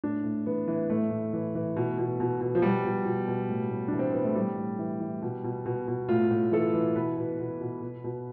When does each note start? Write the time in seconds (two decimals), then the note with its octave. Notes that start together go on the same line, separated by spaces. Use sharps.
0.04 A2 D4
0.24 A2
0.46 E3 B3
0.68 E3
0.90 A2 A3
1.11 A2
1.33 E3
1.55 E3
1.77 B2
1.98 B2
2.20 B2
2.41 B2
2.55 F3
2.62 B2 G3
2.85 B2
3.06 B2
3.28 B2
3.49 A2
3.70 A2
3.88 E3 D4
3.99 C4
4.12 E3 B3
4.24 A3
4.35 A2 G3
4.58 A2
4.79 E3
5.00 E3
5.22 B2
5.44 B2
5.66 B2
5.88 B2
6.09 A2 F4
6.31 A2
6.52 E3 A4
6.74 E3
6.96 B2 B4
7.18 B2
7.39 B2
7.61 B2
7.82 B2
8.04 B2